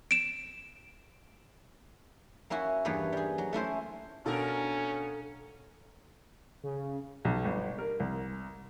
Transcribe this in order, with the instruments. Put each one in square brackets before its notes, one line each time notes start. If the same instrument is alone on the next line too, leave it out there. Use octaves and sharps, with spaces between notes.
[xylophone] D7 E7
[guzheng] A#3 C#4 E4 F#4
E2 G2 A#3 B3 B4 C#5
G3 G#4
F#3
A3 C#4 E4 C5
[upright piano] B2 [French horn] C#4 [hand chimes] D4 F5 [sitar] A4 A#4
[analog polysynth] C#3
[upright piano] B1
G1
A#4
C2